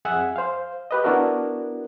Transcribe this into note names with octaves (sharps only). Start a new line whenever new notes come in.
F2 G#4 E5 F#5 G#5
C5 F5
G4 B4 D#5
B3 D4 E4 F#4 A#4